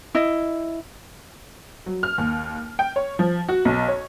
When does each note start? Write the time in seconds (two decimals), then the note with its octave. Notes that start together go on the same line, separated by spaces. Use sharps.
0.15 E4 D#5
1.86 F#3
2.03 F6
2.18 D#2
2.79 G5
2.96 C#5
3.19 F3
3.49 F#4
3.65 B1
3.88 C#5